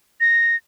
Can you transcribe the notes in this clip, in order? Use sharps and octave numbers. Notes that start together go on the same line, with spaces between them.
A#6